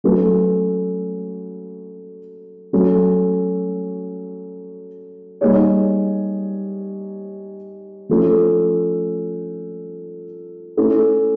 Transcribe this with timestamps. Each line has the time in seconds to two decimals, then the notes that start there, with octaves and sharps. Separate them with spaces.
0.04 F#3 A3 C#4 F#4 B4
2.73 F#3 A3 C#4
5.41 G3 A#3 D#4 G#4 C#5
8.09 F3 A3 C#4
10.77 A3 C#4 E4 A4